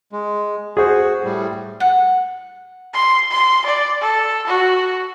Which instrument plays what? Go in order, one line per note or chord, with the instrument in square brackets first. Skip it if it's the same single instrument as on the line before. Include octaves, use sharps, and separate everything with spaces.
[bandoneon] G#3
[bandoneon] F#4 [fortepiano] G#4 C5
[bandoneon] A2 G3
[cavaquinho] F#5
[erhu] C6
C6
D5
A4
F#4